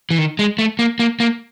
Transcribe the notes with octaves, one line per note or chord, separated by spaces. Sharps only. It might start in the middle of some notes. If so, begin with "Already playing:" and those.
E3
D#3
G#3
A3
A#3
A#3
A#3